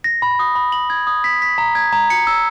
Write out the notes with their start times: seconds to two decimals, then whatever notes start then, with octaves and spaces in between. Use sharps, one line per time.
0.04 A#6
0.22 B5
0.39 D#6
0.55 B5
0.72 F#7
0.90 G#6
1.07 D#6
1.24 B6
1.42 B6
1.58 A#5
1.75 G#6
1.93 A#5
2.10 C#7
2.27 E6